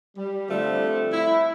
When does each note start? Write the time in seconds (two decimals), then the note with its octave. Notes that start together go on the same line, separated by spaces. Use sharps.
0.17 G3
0.49 D3 F3 G3 A3 C4
1.11 E4